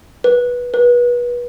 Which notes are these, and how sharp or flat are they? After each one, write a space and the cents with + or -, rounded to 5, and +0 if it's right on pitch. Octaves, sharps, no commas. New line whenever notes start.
B4 -15
B4 -30